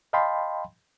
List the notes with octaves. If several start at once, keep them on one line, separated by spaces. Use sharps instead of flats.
D#5 F5 G5 A5 B5 C6